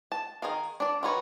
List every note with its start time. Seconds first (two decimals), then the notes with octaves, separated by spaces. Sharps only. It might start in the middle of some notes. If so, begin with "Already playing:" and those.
0.12 A5
0.42 D#3 G#4 A#4 F5
0.80 D4 D5
1.03 D#3 F4 F#4 B4 C#5